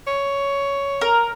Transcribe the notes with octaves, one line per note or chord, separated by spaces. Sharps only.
C#5
A#4